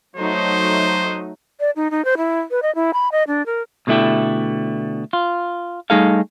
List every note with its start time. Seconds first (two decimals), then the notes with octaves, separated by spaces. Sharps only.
0.17 F#3 A3 D#4 C5
1.60 D5
1.76 D#4
1.91 D#4
2.05 C5
2.17 E4
2.51 B4
2.62 D#5
2.75 E4
2.94 B5
3.12 D#5
3.27 D4
3.46 A#4
3.87 B2 D3 A3 E4 G4
5.13 F4
5.90 G3 A3 D#4 G#4 A4 F5